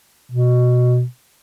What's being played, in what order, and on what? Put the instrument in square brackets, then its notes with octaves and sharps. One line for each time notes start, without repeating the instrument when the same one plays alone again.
[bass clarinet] B2